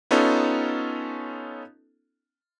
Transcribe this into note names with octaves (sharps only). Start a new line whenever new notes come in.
B3 C#4 D#4 F4 A4